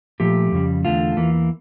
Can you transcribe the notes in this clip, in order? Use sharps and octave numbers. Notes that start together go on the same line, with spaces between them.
A#2 F3 A3 G4
F2 C#3 G3
E2 D3 A3 F4
E2 E3 A#3